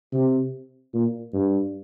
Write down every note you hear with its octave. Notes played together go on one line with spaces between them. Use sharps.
C3
A#2
G2